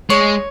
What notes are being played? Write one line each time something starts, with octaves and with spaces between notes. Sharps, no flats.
G#3 C#5